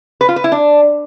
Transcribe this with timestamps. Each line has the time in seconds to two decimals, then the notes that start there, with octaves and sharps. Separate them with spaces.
0.21 B4
0.29 F4
0.36 B4
0.44 E4
0.52 D4